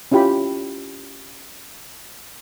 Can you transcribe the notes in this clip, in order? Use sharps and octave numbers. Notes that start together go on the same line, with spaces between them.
C#4 E4 F4 G4 G5 B5